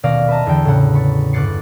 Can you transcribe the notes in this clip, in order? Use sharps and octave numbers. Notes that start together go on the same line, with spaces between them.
D#1 B2 D5 F5 A#6
B4 D#5 E5 A5 A#5
E2 D3 G5
A2 C#3 F#5
B5 C#6 A6
G1 D6 F#6 A6 C7 C#7